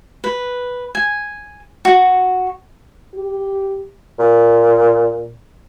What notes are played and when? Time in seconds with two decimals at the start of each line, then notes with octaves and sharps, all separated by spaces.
0.24 B4
0.95 G#5
1.85 F#4
3.15 G4
4.19 A#2